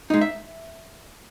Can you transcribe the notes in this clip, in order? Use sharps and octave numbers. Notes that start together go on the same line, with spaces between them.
G#3 D#4
E5